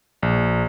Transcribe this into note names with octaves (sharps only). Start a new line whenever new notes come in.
A#1